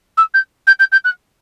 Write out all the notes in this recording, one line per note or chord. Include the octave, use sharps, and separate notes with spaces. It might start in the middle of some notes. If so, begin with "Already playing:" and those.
E6
G6
G6
G6
G6
F#6